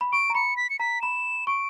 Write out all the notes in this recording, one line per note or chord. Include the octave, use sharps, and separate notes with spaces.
B5
C#6 D7
A#5
B5 C#7
B6
C#7
A#5 B6
B5 E7
C#6 D7